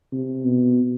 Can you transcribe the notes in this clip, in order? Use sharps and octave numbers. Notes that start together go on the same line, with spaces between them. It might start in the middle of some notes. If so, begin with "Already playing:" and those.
C3
B2